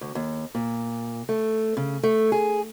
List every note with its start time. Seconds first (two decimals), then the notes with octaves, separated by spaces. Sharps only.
0.01 D2
0.15 D#2
0.55 A#2
1.29 A3
1.77 C#3
2.03 A3
2.32 G#4